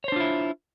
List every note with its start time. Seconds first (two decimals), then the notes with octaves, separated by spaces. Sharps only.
0.04 C#5
0.08 C5
0.12 D4
0.16 F4
0.20 E4